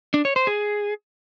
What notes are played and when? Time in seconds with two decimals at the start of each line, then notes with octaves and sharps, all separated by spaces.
0.14 D4
0.25 C#5
0.36 C5
0.47 G#4